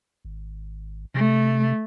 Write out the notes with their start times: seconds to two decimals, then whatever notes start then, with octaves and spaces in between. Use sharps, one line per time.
0.25 G#1
1.14 C3 A3